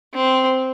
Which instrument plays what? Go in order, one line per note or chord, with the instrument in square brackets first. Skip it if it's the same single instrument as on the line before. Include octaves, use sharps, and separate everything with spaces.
[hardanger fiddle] C4